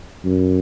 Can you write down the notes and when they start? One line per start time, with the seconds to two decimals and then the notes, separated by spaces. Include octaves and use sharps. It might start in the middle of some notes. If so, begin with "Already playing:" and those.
0.25 F#2